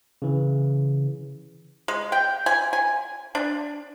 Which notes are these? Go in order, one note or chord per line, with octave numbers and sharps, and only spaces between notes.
C#3 E3
G#3
G5
G#5
G#5
D4